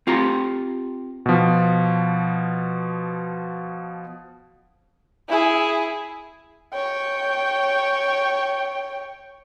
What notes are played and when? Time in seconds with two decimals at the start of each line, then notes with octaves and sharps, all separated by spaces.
0.07 C4 F4 G4 A#5
1.26 B2 F3
5.29 E4 G#4
6.73 C#5 G5